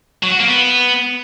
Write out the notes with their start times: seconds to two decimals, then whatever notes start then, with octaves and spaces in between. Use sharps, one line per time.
0.23 F#3
0.31 F#4
0.40 A#3
0.48 B3